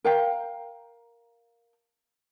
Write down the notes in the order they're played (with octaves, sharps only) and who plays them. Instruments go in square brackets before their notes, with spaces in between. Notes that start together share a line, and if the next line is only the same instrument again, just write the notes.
[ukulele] A#4 F5 G5